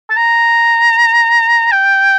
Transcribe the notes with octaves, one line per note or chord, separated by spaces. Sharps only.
A5
A#5
G5